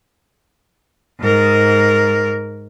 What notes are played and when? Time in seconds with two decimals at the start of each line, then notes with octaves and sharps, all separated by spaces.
1.21 G#2 A#4